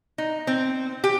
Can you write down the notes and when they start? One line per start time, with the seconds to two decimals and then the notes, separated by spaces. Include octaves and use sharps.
0.18 D#4
0.47 C4
1.04 G4